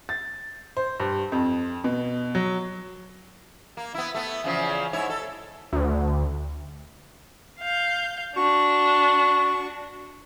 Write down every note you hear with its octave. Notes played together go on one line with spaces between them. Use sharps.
A6
C5
G2
F2
B2
F#3
A#3
B3 E4
A3 B3
E2 C#3 F3
G#2 E4 C#5
A4
D2
F5 G6
D4 F#4 C#6